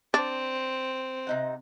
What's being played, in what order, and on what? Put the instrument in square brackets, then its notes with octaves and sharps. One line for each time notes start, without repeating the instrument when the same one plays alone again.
[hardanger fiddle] C4 [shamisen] D4
[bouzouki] C3 D#4 F#5